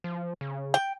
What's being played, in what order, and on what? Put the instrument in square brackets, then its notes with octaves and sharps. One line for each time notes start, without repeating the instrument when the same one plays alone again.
[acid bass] F3
C#3
[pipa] G5